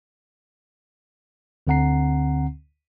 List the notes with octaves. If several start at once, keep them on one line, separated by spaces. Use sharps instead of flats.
D2 D3 C4 F#5 A#5 C7